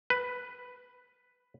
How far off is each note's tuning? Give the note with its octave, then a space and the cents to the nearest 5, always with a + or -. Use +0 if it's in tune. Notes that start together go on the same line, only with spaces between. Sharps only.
B4 +5